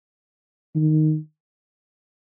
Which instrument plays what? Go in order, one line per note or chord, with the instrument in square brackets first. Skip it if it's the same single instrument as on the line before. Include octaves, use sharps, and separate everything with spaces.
[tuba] D#3